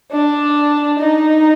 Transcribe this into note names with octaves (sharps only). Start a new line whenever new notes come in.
D4
D#4